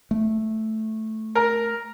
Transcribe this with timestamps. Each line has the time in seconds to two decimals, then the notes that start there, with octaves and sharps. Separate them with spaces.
0.11 A3
1.35 A#4